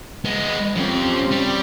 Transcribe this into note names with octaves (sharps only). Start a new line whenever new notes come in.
G#3 B3
F2 F3 C4 C#4 G4
G3